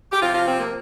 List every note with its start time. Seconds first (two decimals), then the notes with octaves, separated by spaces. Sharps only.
0.12 G4
0.22 C3 F3 F4
0.34 F3 F4
0.47 F3 C4
0.59 A#3